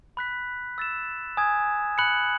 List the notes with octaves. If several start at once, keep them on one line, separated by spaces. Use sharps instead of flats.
B5 F#6 B6
E6 A6 E7
G#5 D#6 G#6
B5 F#6 C#7 F#7